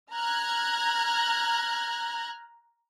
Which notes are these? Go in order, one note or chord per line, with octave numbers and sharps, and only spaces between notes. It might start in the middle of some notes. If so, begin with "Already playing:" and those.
A#5 F6 F#6 G#6 A#6